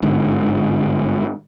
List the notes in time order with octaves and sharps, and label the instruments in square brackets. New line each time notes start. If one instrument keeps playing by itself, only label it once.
[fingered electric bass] G1 G#2 D3